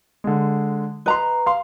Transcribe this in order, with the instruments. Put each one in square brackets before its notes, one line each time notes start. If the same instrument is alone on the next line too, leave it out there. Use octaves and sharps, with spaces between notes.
[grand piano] D3 G#3
[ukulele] B4 A#5 [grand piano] D#5 C6
[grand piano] F5 C6